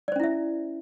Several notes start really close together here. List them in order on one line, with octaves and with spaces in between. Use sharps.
D5 C5 C#4 E4 E5